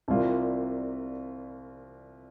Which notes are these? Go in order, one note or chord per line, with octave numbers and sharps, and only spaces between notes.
C2 C3 G3 A#3 F4